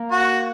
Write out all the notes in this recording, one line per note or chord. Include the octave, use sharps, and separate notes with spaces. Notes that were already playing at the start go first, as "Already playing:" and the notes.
Already playing: A#3
F#4